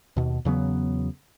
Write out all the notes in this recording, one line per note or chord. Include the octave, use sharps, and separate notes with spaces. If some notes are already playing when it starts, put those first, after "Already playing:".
D#2 B2
E2 C#3 F#3 B3